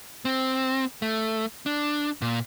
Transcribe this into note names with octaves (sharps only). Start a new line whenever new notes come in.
C4
A3
D4
A#2